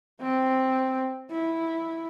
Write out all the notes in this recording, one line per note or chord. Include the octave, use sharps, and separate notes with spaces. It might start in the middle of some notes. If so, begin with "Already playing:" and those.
C4
E4